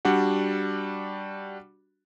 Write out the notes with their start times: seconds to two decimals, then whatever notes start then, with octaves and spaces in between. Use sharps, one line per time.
0.05 G3 D4 F#4 F#5